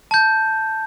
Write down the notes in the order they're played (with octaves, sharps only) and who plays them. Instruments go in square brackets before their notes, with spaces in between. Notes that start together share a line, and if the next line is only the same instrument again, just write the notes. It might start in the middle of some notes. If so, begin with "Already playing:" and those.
[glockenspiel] A5 G6